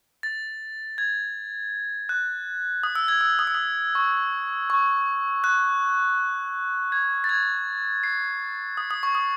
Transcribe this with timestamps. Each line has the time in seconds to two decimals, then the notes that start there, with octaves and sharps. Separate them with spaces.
0.23 A6
0.98 G#6
2.09 F#6
2.83 D#6
2.95 E6
3.08 G#6
3.21 E6
3.39 D#6
3.47 E6
3.54 D#6
3.95 C#6
4.70 C#6
5.44 F#6
6.92 G#6
7.24 A6
7.29 G#6
8.03 C7
8.77 D#6
8.91 D#6
9.03 C#6
9.15 D#6